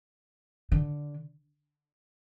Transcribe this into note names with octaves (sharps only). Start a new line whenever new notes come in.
D3